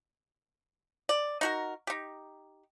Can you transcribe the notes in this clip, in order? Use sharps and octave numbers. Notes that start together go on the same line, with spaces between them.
D5
D#4 F#4 A#4
D#4 G4